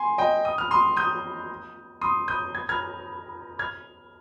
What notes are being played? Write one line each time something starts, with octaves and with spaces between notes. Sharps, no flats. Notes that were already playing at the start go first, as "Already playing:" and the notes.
Already playing: G#5 C6
D#5 G5
D#6
F6
C6 D#6
D#6 G6
C6 D#6
D#6 G6
G#6
F6 G#6
F6 G#6